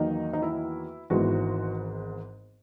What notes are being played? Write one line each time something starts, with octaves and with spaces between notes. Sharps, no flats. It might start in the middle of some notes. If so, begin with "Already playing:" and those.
Already playing: E2 D#3 F#3 A#3 D#4
D#4
E4
G#1 G#2 E3 G#3 B3 F#4